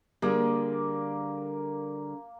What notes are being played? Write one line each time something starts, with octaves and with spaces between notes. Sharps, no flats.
D3 G3 A#3 G#4